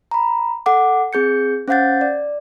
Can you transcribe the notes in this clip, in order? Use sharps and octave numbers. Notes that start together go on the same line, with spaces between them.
A#5 B5
A4 F#5 D6
C4 G#4 G6 C#7
C#4 C5 F5 F#5 G6 A6
D5